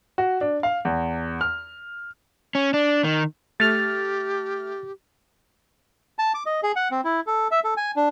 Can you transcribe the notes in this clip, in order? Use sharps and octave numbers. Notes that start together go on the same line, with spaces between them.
F#4
D4
F5
E2
F6
C#4
D4
D#3
A3 G4 F6 A6
A5
D6
D#5
G#4
F#5
C4
E4
A4
E5
A4
G#5
D4